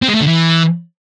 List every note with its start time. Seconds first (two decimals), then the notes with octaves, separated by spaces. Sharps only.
0.02 C4
0.08 G#3
0.15 A3
0.21 D3
0.27 E3